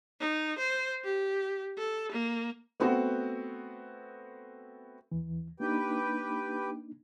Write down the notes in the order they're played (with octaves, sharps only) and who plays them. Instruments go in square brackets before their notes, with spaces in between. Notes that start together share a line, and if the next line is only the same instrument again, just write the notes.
[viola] D#4
C5
G4
A4
A#3
[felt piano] A3 B3 C4 F#4
[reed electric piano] D#2 E3
[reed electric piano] A#3 D4 D#4 [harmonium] G4 B4 G5